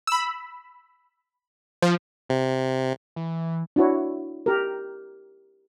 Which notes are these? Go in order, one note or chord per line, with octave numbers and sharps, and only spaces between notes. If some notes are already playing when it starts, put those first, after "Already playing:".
B5 E6
F3
C3
E3
D4 E4 F#4 C#5
G4 A#4